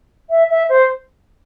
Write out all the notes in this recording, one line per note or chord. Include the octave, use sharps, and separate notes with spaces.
E5
E5
C5